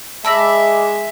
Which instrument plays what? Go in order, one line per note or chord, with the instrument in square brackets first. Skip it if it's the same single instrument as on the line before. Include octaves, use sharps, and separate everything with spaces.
[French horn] G#3 [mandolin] D5 B5 [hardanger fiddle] E5 [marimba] A5 E6 A#6